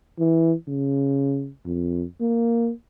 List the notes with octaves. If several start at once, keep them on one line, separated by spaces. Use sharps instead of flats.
E3
C#3
F2
A#3